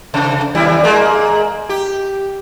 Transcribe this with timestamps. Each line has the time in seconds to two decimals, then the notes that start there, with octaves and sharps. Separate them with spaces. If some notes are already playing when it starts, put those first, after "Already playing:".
0.14 C3
0.55 D#2 G3 E4
0.84 G#3 A#3
1.69 G4